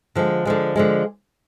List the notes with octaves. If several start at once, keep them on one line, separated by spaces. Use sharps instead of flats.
D3 F3 G#3
D3 F3 G#3
D3 F3 G#3